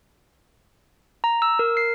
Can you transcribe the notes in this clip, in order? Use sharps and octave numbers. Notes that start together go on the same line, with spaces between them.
A#5
E6
A#4
C7